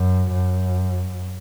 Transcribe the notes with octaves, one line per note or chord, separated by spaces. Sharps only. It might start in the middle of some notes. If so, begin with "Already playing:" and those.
Already playing: F#2
F#2